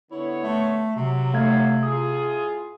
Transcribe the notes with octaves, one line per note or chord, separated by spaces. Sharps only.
D3 B3 E4 C#5
A3
C3 F#3
A3 F5 G#6
A2 F4 G#4 D#6